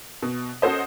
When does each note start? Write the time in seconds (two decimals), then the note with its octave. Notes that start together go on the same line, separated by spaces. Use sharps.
0.22 B2
0.62 C#4 F#4 A4 C5 D#5